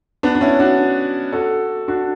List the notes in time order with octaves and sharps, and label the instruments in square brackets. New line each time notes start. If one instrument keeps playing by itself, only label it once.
[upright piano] B3 D4
D4
C#4 E4
D4 F#4
F#4 A4
D4 F#4